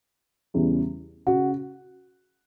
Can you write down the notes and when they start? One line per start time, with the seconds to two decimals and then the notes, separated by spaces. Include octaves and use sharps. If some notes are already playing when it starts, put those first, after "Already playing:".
0.54 E2 C#3 E3 G3
1.27 C#3 F#4